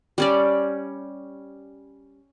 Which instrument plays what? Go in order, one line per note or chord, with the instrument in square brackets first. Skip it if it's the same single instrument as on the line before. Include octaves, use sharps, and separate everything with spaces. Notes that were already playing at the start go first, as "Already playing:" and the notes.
[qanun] G3 C#4 D5